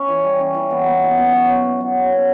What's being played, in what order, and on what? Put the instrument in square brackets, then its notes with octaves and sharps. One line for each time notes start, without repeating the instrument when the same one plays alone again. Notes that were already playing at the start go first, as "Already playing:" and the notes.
Already playing: [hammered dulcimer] C#4
E3
G3
C#4
E3
B3
B2
B2
B2
F#3
F#3
B3
F#3
C#3
B3